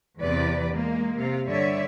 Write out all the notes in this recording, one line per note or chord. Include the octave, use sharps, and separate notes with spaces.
E2 C3 B3 B4 D5
G#3 A#3
C3 F5
G2 D3 C#5 D5 E5